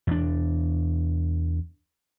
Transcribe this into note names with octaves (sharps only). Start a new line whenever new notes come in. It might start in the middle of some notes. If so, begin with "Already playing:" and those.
E2 D4